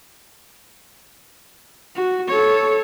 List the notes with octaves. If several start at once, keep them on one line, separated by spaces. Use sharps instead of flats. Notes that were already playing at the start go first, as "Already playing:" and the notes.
F#4
A4 C#5